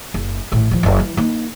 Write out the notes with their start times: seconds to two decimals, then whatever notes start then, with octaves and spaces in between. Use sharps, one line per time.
0.14 F#1
0.52 A1 A2
0.71 D1 F3
0.83 F#1 C#4
0.99 E3
1.17 A#3 D#4